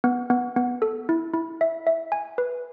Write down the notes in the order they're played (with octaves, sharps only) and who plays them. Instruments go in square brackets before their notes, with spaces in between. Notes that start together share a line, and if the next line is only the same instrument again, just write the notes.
[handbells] B3
B3
B3
A4
E4
E4
E5
E5
G#5
B4